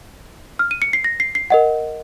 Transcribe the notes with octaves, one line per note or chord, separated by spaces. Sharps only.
F6
D#7
C#7
C7
A#6
C7
C7
A#4 D#5 F#5